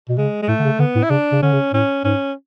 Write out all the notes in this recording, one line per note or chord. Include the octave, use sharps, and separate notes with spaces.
B2
C#3 G#3
G#3
A2 A3
D3
C#3
D3 B3
A2
E4
C#3 D4
C#3
D3 C#4
C#3
A2 C#4
G#2 C#4